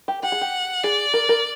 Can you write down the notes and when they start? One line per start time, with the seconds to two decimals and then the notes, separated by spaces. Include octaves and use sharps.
0.08 G4
0.23 G4 F#5
0.32 G#4
0.41 G4
0.84 G#4 D5
1.14 A#4
1.29 A#4